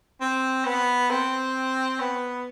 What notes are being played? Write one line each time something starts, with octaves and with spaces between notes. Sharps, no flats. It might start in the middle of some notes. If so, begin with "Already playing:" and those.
C4
B3
C4
B3